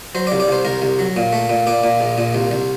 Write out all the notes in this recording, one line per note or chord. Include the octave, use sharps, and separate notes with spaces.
F#3 C5
D5
C2
D5
C2 C5
C2 A#4
C2
F#3
A#2
A3
A#2
A#2 D5
A#2
A#1
A#2
C2
C2